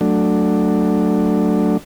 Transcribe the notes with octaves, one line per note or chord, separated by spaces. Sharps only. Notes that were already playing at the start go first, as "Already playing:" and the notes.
F#3 A3 D4